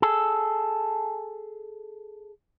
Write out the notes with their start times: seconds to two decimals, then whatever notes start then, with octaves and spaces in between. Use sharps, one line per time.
0.02 G#4 A4